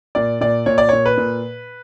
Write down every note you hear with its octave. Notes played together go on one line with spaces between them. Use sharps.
A#2 D5
A#2 D5
A#2 C#5
D5
A#2 C#5
B4
A#2